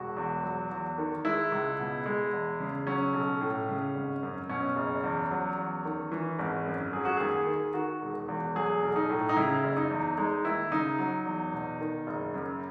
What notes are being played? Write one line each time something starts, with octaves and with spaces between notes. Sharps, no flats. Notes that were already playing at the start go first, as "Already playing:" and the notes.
Already playing: E1 F#4
E2
F#3
E2
D#3
G#3 E4
C#2
B2
G#3
E2
C#3
F#3 C#4
B1
A2
C#3
G#1
F#2
B2 C#4
F#1
E2
F#3
E2
D#3
E3
G#1
F#2
F#3 G#4
F#4
D#2 G#4
D#3
D#3 F#4
E1
E2
F#3 G#4
B1
D#4
A2
D#4
C#3 E4
F#1
D#4
E2
G#3 D#4
D#2 E4
C#3 D#4
F#3
E2
B2
D#3
F#1
F#2